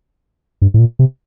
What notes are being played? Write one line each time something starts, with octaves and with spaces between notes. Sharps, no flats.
G2
A2
A#2
C3